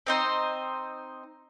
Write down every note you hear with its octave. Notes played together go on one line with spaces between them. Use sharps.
C4 D#4 C5